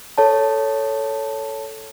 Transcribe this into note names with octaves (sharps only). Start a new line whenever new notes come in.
A4 C#5 A5